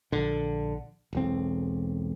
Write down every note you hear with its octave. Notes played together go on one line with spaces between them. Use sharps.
A#1 D3
E1 B1 C4